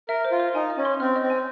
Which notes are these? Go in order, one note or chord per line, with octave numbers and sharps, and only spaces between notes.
A#4 E5
C5
F4
C5
D#4 G#5
D#5
C#4
C6
C4 F6
D#5
C4
G#5